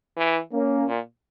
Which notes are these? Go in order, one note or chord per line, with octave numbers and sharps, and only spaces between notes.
E3
A#3 C#4
A#2